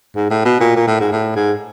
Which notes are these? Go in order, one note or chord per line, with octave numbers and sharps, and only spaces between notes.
G#2
A2
B2
A#2
A#2
A2
G#2
A2
G#2